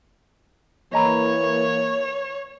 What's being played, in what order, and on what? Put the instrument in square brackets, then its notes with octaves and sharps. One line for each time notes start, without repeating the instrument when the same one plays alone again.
[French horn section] E3 A#3 [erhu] C#5 [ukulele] D#5 A#5 B5